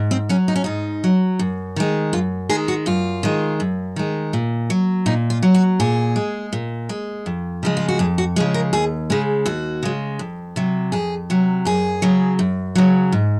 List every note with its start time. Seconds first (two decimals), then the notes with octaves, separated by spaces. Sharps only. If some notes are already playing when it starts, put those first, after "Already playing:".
Already playing: G#2
0.11 C4
0.29 F#3 C#4
0.48 D#4
0.56 C#4
0.64 G#2 D#4
1.04 F#3
1.39 F#2
1.76 D#3 G#3
2.13 F#2 F4
2.49 D#3 G#3 G#4
2.68 F#4
2.86 F#2 F4
3.23 D#3 G#3
3.60 F#2
3.96 D#3 G#3
4.33 A#2
4.70 F#3
5.06 A#2 D#4
5.30 F4
5.43 F#3
5.54 F#4
5.80 A#2 G#4
6.16 G#3
6.53 A#2
6.89 G#3
7.26 F2
7.63 C#3 F3 G#3
7.77 F4
7.88 F#4
7.99 F2 G#4
8.18 F#4
8.36 C#3 F3 G#3 G#4
8.54 A#4
8.73 D#2 G#4
9.10 C#3 G#3 G#4
9.46 D#2 F#4
9.83 C#3 G#3
10.19 F2
10.56 C3 F#3
10.92 F2 G#4
11.30 C3 F#3
11.65 F#2 G#4
12.02 C#3 F#3
12.39 F#2
12.75 C#3 F#3
13.12 G#2